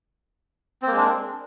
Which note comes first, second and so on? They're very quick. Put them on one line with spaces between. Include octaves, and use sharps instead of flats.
C4 A#3 G#3 D4